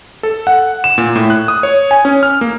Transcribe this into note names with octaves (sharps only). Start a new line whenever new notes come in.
A4
F#5
E7
A#2
A2
F#6
D#6
C#5
G#5
C#4
F6
A#3